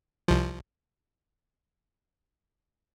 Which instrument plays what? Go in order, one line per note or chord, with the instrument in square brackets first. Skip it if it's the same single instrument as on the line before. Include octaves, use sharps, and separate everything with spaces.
[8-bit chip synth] C2 F3